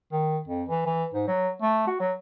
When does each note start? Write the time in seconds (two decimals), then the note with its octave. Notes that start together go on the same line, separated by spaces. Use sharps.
0.12 D#3
0.48 F2
0.69 E3
0.86 E3
1.14 G#2
1.28 F#3
1.62 A3
1.87 F#4
2.00 F#3